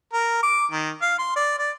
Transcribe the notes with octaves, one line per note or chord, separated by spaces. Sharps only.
A#4
D6
D#3
F5
C6
D5
D5